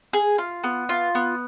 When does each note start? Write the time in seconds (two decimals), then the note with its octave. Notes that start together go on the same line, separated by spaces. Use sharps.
0.13 G#4
0.38 F4
0.64 B3
0.89 F4
1.15 B3